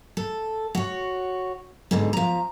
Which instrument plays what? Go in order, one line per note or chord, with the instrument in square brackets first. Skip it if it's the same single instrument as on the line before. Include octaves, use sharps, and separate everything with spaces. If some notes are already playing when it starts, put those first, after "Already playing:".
[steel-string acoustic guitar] A4
F#4 C#5
G#2 B2 D3
F3 A#5